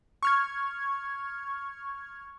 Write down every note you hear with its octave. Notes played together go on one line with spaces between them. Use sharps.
C#6 F6 G#6